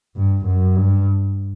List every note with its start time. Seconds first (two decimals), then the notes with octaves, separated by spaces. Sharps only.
0.16 G2
0.46 F#2
0.76 G2